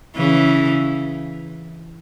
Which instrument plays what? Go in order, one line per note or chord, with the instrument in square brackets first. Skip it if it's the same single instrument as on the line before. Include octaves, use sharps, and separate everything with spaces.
[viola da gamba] C#3 E3